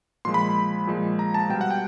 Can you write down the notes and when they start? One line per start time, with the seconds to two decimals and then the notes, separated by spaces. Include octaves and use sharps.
0.25 A#2 F3 G#3 C6
0.34 B5
0.87 A#2 F3 G#3
1.19 A#5
1.34 A5
1.49 B2 G3 G5
1.61 F#5
1.71 G5